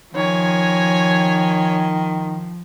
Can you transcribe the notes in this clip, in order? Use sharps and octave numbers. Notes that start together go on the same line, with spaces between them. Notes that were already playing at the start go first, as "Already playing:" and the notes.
D#3 F3 C#5 G#5